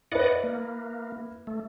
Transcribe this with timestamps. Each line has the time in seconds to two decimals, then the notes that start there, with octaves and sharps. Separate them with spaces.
0.12 E4 B4 D5 D#5 F#5
0.44 A#3
1.47 A3